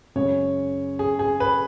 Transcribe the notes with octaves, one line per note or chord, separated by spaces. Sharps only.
F#2 C#3 G#3 C#5
G#4
G#4
B4